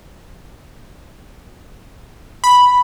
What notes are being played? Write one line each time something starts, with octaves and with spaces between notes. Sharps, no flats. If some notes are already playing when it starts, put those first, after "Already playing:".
B5